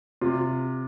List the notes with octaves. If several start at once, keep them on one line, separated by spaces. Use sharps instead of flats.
C3 F4